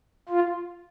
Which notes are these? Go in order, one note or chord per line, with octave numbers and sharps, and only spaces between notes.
F4